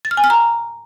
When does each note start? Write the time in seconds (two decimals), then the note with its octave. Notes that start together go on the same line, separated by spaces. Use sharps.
0.05 A6
0.11 F6
0.17 G#5
0.24 F6
0.30 A#5